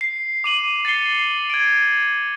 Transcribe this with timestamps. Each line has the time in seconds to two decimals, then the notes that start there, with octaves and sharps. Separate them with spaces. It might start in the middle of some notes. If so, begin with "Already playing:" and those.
0.01 C7
0.44 D6 D#7 F#7
0.85 A6 C7 C#7 G7
1.50 G#6 D7